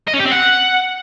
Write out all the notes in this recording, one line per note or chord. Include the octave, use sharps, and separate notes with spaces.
D#5
C#4
G4
C4
F#5